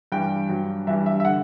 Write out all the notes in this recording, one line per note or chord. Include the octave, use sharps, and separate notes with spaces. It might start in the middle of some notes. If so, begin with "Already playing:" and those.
G2 E3 G3 G5
G2 F#3
G2 E3 G3 E5
E5
E5
D3 F#5